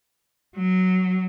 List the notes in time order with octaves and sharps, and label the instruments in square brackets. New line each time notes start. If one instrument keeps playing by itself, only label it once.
[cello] F#3